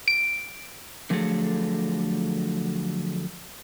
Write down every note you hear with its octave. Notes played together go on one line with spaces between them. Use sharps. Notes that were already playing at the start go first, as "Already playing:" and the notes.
D7
D3 F3 F#3 A3 G#4 A4